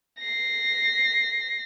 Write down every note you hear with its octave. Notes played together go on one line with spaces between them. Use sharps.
A#6 C7